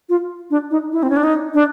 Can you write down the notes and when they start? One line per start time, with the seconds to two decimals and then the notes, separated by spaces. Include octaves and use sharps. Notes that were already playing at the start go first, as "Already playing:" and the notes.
0.09 F4
0.51 D4
0.71 D#4
0.93 E4
1.03 C4
1.10 C#4
1.17 D4
1.24 D#4
1.54 D4